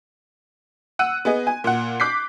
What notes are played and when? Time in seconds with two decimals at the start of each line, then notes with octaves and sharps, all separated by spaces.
0.99 F#5 E6 F#6 D#7
1.25 B3 G#4 D#5
1.47 G#5
1.64 A#2 F#5
2.00 D6 F#6 G6 B6 C7